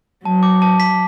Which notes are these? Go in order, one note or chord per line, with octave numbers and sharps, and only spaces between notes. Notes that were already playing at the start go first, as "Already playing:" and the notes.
F#3 A5
D6
A5
B6